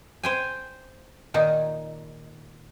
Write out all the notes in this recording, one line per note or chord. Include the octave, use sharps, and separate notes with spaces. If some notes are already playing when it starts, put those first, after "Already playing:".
C5 G5 G#5
A#2 D#3 D#4